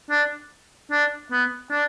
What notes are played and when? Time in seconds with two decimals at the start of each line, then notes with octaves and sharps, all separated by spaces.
0.11 D4
0.92 D4
1.32 B3
1.71 D4